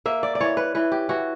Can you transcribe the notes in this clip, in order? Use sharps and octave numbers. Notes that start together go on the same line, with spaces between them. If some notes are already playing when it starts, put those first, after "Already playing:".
A#3 E5
D5
D5
E3 C#5
B4
E3 B4
G4
E3 F#4